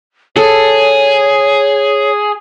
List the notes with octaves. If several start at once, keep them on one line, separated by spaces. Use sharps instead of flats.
G#4 A4 C#5